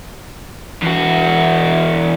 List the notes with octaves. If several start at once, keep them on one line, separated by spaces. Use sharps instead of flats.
E2 F#4